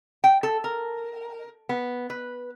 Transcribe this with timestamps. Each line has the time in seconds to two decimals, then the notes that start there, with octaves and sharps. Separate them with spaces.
0.24 G5
0.43 A4
0.64 A#4
1.69 B3
2.10 B4